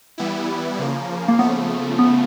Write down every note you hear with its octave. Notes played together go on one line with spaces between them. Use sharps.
E3 G3 B3 E4
C#3 F3 A#3
A#3
C#3 F3 A3 B3
B3